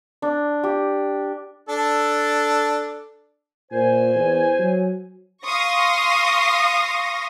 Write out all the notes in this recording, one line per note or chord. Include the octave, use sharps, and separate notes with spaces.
D4
G4
D4 A4
A#2 C5 G#5
E2
F#3
F5 C6 C#6 D#6 A#6